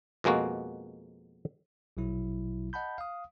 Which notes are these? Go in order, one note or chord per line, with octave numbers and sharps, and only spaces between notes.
F2 B2 G#3 A#3 F#4
A#1 B2 F#3 E4
D#5 F#5 A5 B5 G6
F5 D#6